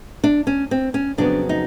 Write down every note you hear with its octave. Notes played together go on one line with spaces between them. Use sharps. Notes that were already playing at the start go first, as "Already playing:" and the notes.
D4
C#4
C4
C#4
F2 C#3 F#3 B3 D4
D#4